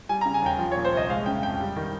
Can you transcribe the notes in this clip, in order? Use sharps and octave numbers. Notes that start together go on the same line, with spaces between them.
G3 G#5
A#5
C#3
G#5
D#2 G5
F3
C#5
A#2
C5
C2
D#5
G#3 F5
C#3 G5
F2 G5
G3
D#3